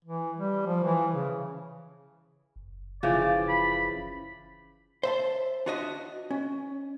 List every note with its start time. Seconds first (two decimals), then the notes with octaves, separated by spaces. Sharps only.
0.05 E3
0.36 G3
0.66 F3
0.84 E3
1.13 C#3
2.56 F#1
3.03 C#3 E3 F3 D5
3.49 B5
5.03 C5 E5 A5
5.66 D4 F4 F#4 B4 D#5 E5
6.30 C#4